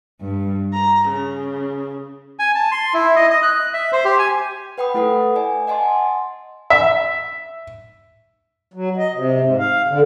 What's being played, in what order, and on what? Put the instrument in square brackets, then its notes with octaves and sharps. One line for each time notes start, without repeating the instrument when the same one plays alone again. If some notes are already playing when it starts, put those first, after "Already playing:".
[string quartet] G2
A#5
C#3
[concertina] G#5
A5
C6
E4
D#5
D#5
F#6
E5
C5
G4
G#5
[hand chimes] B4 F#5 G5 B5 D#6
A3 E4 A4 B4 F#5
D5 G#5
D#5 F#5 G#5 A5 C6
[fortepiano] E5
[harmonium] F#3
D#5
C3
G#2
F5
D3